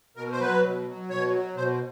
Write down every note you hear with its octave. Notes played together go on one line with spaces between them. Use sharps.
B2 A#4
C5
F#3 B4
B2
F#3
B2 C#5
F#3
B2 C5